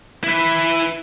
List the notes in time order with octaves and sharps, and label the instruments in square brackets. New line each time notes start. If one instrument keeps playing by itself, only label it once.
[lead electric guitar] E4 B4